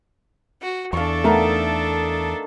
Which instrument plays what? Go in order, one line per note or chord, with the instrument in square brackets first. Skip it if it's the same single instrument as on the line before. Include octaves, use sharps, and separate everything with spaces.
[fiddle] F#4
[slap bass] E2 [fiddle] D4 A4 [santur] F5 C#6
[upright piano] A3 B3 [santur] D#4 A#4 E5